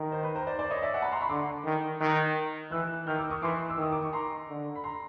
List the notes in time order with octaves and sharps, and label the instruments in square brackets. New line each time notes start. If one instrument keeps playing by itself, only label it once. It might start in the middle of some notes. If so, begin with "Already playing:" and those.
Already playing: [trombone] D#3 [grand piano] A#4
[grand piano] C5
B4
A#4 C5
C5 D5
C5 D5
C#5 D#5
D5 E5
E5 F#5
A5 B5
A#5 C6
B5 C#6
[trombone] D3 [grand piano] C6 D6
[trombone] D#3
[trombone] D#3 [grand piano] E6 F#6
[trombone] E3 [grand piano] E6 F#6
[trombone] D#3 [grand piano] F6 G6
[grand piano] D6 E6
C#6 D#6
[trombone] E3 [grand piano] C6 D6
[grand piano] E6
[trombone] D#3 [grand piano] D#6
[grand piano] D6
C#6
A#5 C6
[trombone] D3
[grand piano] B5
A#5 C6